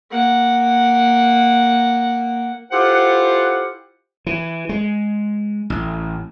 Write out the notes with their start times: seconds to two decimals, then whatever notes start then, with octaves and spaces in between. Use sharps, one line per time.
0.11 A#3 F#5
2.71 E4 F4 G4 A4 C5 F#5
4.26 E3
4.69 G#3
5.70 A1